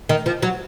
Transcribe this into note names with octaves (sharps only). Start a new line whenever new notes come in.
D#3
F3
F#3